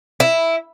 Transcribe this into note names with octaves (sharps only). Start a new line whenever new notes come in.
E4